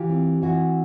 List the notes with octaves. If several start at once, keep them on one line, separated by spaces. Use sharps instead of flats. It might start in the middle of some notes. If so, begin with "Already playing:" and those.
Already playing: E3 F4 G4
C4
E3 E4 F#4